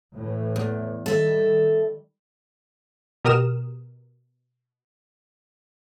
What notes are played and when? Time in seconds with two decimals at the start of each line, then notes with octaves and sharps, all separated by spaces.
0.14 A2 E3 A3
0.56 E2
1.06 D#3 G3 A4 E5
3.25 B2 G4 A#4 D#6 F6 E7